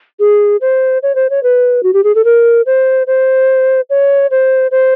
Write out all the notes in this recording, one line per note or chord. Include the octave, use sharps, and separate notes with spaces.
G#4
C5
C#5
C5
C#5
B4
F#4
G4
G#4
A4
A#4
C5
C5
C#5
C5
C5